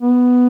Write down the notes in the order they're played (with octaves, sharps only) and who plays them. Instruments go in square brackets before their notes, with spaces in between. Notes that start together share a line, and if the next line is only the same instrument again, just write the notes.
[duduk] B3